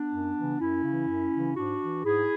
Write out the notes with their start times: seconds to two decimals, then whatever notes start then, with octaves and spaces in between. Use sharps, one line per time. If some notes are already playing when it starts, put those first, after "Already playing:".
Already playing: B3 D4
0.11 F#2
0.36 C#3 E3
0.59 F#2 C#4 E4
0.83 C#3
0.88 E3
1.08 F#2
1.33 C#3 E3
1.56 G#2 D4 F#4
1.81 E3
2.05 G#2 E4 G#4